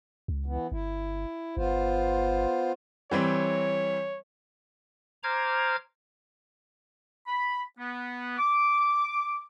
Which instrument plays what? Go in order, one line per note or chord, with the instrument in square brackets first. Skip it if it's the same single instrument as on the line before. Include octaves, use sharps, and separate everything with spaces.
[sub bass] C#2
[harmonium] E3 B3
[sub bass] G1 [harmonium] E4
[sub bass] G1 [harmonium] B3 F4 C5
[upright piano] E3 G3 C4 [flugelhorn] C#5
[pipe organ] C5 A#5 D6 F6 G#6
[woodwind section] B5
B3
D6